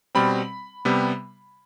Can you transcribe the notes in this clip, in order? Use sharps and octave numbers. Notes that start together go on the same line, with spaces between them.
B2 G3 C4 B5
C3 G3 B3